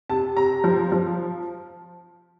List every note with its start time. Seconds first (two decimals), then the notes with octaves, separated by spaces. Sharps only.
0.09 C3 A5
0.37 C3 A#5
0.64 F3
0.92 F3